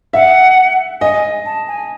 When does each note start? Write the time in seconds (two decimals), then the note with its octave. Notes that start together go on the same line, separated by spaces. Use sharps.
0.13 E5 F#5
1.01 D#5 G#5
1.45 A5
1.68 G#5